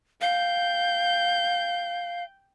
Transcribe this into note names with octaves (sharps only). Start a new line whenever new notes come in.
F5 G5 G6